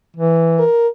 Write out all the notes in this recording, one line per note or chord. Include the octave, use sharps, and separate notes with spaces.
E3
A#4